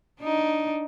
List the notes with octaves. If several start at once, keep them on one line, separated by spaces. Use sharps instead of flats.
D4 D#4